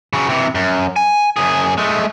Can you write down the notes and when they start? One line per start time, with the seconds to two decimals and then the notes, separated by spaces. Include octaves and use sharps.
0.13 C#3 F#3
0.29 C3 E3
0.55 F#2
0.96 G#5
1.36 F#2 G#4
1.78 G#3 A3